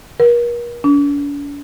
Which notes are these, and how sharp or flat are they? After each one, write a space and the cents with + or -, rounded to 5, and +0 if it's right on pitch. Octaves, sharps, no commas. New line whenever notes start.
A#4 +40
D4 -45